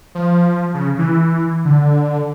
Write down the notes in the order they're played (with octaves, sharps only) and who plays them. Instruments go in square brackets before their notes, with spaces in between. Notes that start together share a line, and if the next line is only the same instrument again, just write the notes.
[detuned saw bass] F3
C#3
E3
D3